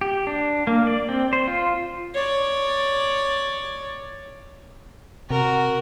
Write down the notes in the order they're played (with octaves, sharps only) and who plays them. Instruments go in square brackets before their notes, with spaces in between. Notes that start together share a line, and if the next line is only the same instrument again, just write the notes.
[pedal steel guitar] G4
D4
A#3
D5
C4
C5
F4
[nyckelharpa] C#5 D5
[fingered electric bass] C3 [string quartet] F#4 A#4